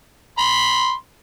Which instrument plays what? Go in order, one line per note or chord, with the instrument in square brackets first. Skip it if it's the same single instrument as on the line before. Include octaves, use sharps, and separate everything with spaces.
[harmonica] B5 C6